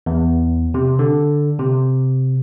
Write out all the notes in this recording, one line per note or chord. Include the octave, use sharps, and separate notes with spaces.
E2
C3
D3
C3